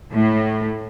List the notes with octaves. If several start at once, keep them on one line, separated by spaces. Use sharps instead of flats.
A2